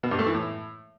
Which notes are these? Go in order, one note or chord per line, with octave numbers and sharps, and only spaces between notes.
B2
G2
A3
E3
A2